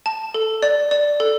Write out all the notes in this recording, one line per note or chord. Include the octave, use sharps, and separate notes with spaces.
A5
A4
D5
D5
A4